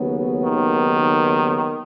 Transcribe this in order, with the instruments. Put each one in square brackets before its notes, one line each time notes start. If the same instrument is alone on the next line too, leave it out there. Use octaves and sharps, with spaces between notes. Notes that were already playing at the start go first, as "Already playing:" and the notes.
Already playing: [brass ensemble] D#2 C#3 F#3 B3
[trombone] D#3